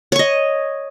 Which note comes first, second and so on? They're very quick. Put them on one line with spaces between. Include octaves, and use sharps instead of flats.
C#5 C#6 D#5